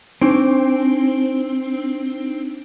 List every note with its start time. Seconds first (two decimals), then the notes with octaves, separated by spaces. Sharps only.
0.22 C4 D4 D#4 D7